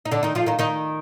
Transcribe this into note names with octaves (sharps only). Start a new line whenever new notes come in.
D#4
D3 D4
D#3 D#4
F3 F4
D#3 D#4
D#3 D#4